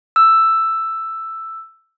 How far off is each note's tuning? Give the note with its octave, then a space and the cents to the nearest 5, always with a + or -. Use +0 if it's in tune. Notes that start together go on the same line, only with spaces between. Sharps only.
E6 +5